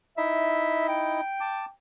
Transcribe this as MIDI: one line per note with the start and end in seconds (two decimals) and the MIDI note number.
0.17 1.21 63
0.17 1.21 64
0.17 1.21 75
0.17 0.85 76
0.88 1.71 79
1.40 1.65 81
1.40 1.65 86